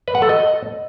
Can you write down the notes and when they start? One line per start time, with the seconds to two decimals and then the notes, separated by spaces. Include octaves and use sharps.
0.08 B4
0.15 F#5
0.22 A4
0.29 D#5